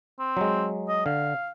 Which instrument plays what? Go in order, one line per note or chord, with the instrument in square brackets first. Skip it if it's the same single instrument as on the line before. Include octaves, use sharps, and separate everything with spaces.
[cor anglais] C4
[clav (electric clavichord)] F#3 G#3
[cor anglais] D#5
[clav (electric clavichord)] D3 [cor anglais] F5